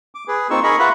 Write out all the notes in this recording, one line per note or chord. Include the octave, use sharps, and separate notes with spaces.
D6
G#4 B4
A#3 C4 D#4 F4 C#6 E6
G#4 A#4 D#5 B5 C#6
F4 B4 E5 F#5 B5 C#6